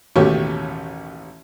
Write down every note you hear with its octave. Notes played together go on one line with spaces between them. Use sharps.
A1 D#2 B2 A3 G4 C#5